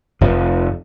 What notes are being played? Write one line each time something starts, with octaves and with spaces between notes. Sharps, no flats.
F1 F2 F3